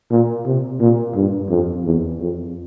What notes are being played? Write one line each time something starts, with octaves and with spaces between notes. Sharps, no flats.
A#2
C3
A#2
G2
F2
E2
F2